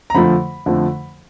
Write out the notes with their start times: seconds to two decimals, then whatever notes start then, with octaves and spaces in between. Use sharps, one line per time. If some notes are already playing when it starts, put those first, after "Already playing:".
0.10 A#5
0.15 F2 D3 F3 A3 B5
0.66 F2 D3 F3 A3